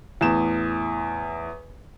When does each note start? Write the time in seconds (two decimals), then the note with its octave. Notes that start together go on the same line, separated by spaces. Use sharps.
0.21 E2 A2 E7